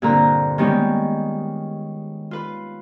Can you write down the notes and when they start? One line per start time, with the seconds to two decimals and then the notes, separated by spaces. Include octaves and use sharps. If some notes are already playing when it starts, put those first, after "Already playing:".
0.02 G2 A#2 D3 C4 A#4 A#5
0.58 D#3 G3 G#3 B3 C#4 G4
2.31 F4 B4